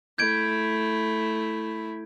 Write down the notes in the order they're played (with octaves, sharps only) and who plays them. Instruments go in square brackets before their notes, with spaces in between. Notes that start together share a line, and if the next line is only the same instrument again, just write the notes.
[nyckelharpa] A3 E4 [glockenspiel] G6 G#6 D7